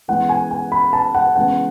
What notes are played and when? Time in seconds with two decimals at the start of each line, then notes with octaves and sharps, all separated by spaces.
0.08 E3 G#3 B3 F#5
0.29 G#5
0.51 G#5
0.72 B5
0.93 A5
1.15 F#5
1.36 C#3 E3 G#3 B3 F#5